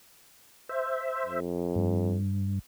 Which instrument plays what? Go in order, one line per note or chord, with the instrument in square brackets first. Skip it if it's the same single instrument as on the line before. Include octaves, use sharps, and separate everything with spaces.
[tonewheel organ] C5 E5
[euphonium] F2
[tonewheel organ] G2